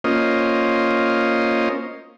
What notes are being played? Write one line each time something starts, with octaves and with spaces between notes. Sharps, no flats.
A#3 C#4 F4 C5 D#5